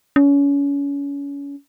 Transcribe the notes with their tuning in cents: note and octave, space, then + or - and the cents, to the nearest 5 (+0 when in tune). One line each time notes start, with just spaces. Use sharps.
C#4 +30